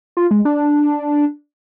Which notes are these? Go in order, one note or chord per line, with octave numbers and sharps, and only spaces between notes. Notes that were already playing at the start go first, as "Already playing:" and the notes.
F4
G#3
D4